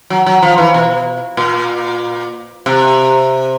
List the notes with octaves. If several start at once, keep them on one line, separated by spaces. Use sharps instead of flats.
F#3
F#3
F3
E3
B2
A#2
C3